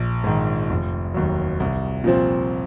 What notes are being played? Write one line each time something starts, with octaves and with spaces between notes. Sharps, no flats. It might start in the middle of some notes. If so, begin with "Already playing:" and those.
Already playing: A#1
G#2 D#3
F1
D#2 D#3 F#3
C2
A#2 F3 C4